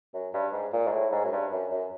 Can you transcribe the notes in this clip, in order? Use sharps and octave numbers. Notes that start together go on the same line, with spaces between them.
F#2
G2
G#2
A#2
G#2
A2
G#2
F#2
G2
F#2
F#2